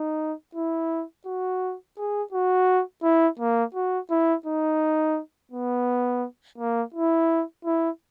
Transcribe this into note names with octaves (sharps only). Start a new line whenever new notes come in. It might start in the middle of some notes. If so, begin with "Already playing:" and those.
Already playing: D#4
E4
F#4
G#4
F#4
E4
A#3
F#4
E4
D#4
B3
A#3
E4
E4